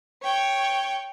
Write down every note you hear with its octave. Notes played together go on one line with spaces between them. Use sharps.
C#5 G5